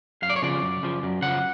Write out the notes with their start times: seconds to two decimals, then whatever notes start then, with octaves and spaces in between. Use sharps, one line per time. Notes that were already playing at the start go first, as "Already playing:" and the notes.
0.22 F#2 F5
0.30 D5
0.36 C#5
0.42 C#3 F3 D5
0.62 F#2
0.83 C#3 F3
1.03 F#2
1.22 C#3 F3 F#5